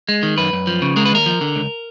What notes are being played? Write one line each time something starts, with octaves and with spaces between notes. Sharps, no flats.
G#3
D#3
F#2 B4
F#2
F3
C#3
G#3 A#4
B4
D#2 A#4
F3
D3
C#2